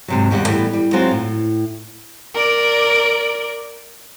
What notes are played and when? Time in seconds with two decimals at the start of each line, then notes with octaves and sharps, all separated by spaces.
0.08 G#2 C3 F#3
0.31 D#2 B2 G3 F#5
0.47 A2 E3 G3 B3
0.73 G3
0.93 F#3 G#3 C4 F4 F#4
1.11 A2
2.35 A#4 D5